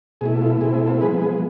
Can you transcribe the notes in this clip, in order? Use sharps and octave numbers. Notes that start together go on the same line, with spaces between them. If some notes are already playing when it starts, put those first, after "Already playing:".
B2 A3 E4 G#4
F4
B2 A3 C4 E4 G#4
G#4
F4 A4
F3 G#3 B3 G#4 B4
G#4